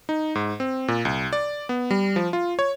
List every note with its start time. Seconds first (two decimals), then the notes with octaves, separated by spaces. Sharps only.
0.09 D#4
0.35 G#2
0.60 C4
0.88 A#2
1.05 C2
1.33 D5
1.69 B3
1.91 G3
2.16 F3
2.33 F4
2.59 C#5